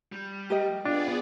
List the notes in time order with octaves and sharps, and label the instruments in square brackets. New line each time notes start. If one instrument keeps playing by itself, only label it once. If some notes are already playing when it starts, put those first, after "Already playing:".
[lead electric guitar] G3
[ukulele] G4 A#4 D#5
[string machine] B3 G#4 D5 [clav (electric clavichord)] D4 [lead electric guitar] F4